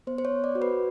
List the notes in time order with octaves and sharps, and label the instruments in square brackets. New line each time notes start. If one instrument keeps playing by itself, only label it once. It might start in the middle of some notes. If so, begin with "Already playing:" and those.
[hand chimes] B3 C5
C5
C#5
B3
D5
F#4
B4